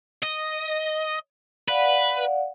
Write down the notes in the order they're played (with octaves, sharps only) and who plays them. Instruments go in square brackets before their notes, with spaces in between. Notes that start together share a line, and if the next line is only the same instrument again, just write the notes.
[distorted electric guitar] D#5
[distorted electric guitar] B4 [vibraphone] D5 F5 F#5